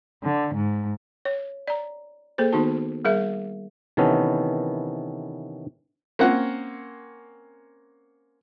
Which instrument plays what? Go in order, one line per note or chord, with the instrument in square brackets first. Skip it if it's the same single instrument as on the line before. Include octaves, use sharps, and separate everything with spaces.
[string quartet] D3
G#2
[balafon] C#5
D5 A#5
A#3 G#4 A4 C5
D#3 B3 D#4 F#4 A5
G3 G#4 A#4 E5
[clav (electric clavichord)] C3 D#3 E3 B3 C#4 A4
[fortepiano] A#3 C4 C#4 F#5